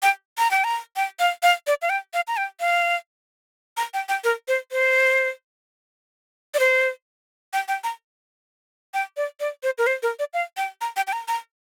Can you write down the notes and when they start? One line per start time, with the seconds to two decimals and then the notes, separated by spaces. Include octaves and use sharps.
0.02 G5
0.38 A#5
0.51 G5
0.64 A#5
0.96 G5
1.19 F5
1.43 F5
1.67 D5
1.82 F5
1.89 G5
2.13 F5
2.27 A#5
2.37 G5
2.60 F5
3.77 A#5
3.94 G5
4.09 G5
4.24 A#4
4.48 C5
4.72 C5
6.54 D5
6.59 C5
7.53 G5
7.68 G5
7.84 A#5
8.94 G5
9.17 D5
9.40 D5
9.63 C5
9.78 A#4
9.87 C5
10.03 A#4
10.19 D5
10.33 F5
10.57 G5
10.81 A#5
10.96 G5
11.07 G5
11.13 A#5
11.28 A#5